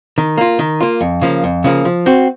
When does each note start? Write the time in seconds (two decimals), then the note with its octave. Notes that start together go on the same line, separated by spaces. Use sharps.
0.18 D#3
0.38 A#3 F4
0.59 D#3
0.81 A#3 F4
1.01 F2
1.21 C#3 F3 A#3
1.44 F2
1.64 C#3 F3 A#3
1.85 F3
2.06 C4 F#4